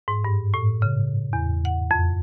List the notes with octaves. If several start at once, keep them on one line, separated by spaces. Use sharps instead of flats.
G#2
G2
A2
C#3
E2
F#5
F2